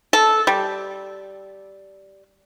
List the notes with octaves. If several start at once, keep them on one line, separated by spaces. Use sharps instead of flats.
A4
G3